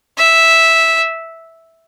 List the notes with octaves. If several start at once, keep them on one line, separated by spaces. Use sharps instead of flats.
E5